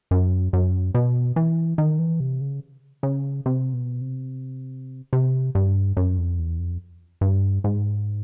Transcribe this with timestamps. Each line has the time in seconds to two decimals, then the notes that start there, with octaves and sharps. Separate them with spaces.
0.11 F#2
0.53 F#2
0.94 B2
1.36 E3
1.78 D#3
1.99 E3
2.20 C3
2.41 C#3
3.03 C#3
3.46 C3
3.73 B2
4.01 C3
5.13 C3
5.55 G2
5.97 F#2
6.18 F2
6.39 E2
6.59 F2
7.21 G2
7.64 G#2